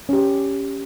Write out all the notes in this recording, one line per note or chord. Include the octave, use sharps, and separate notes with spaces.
C#4 G4